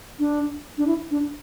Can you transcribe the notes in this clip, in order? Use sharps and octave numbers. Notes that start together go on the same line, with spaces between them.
D4
D4
E4
D4